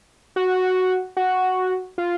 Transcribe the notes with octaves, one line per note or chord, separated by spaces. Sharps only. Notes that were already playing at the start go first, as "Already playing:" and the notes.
F#4
F#4
F4